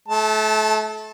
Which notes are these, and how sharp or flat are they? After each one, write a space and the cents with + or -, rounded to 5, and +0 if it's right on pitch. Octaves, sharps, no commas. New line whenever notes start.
A3 -30 A5 +0